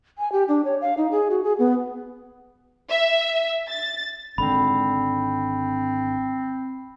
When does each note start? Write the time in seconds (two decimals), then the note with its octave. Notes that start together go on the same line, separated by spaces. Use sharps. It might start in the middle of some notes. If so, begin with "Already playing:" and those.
0.18 G#5
0.32 G4
0.48 D4
0.65 C#5
0.81 F5
0.97 D#4
1.11 G#4
1.30 F#4
1.44 G#4
1.59 B3
2.90 E5
3.70 A6
4.38 G#1 D3 C4 B5